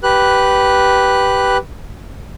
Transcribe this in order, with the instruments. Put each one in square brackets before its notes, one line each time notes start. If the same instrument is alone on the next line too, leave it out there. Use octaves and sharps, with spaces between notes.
[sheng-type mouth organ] G4 B4 F#6